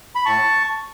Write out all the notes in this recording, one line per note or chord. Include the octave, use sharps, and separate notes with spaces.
B5
A2 A5 C#6